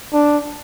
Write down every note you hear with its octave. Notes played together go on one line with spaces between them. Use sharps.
D4